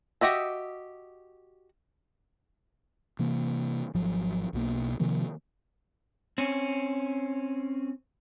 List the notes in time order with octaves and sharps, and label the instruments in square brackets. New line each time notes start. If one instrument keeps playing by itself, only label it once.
[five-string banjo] F#4 G4 D#5 E5
[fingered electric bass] C3 E3 A#3
G#1 F3 F#3
B1 B2 A#3
C3 D#3 F3 A#3
[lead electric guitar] C4 C#4